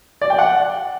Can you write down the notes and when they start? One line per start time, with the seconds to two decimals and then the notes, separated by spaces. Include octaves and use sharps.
0.21 D5
0.30 G5
0.39 F#5